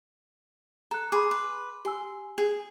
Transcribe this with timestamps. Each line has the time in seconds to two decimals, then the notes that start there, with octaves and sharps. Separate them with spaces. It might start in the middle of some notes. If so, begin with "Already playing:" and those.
0.91 A4 A#5 F#6
1.12 G#4 B5 C6 D6
1.31 B4
1.85 G4 G#5 C6 E6
2.38 G#4